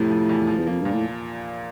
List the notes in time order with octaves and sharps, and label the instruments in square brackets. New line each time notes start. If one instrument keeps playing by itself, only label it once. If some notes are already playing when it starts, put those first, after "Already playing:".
Already playing: [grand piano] F2 C3 [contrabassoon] A2
[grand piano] F3
E2
F3
[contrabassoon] E2
[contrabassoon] F2 [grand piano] A#3
[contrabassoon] G2 [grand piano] A#2
[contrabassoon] A2